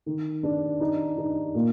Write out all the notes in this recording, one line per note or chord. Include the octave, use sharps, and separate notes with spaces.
D#3
D4
D#4
D#4
A#2